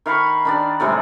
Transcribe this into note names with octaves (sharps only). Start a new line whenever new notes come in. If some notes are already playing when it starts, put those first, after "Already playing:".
D#3 F5 B5 C#6
D#3 D4 D5
A2 C3 G3 G#3